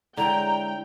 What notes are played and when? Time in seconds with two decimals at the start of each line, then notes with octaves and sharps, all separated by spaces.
0.17 D3 G#3 E4 C#5 G5 A#5